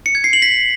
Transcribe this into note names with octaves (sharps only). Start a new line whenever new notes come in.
C#7
G#6
C7
F#7
B6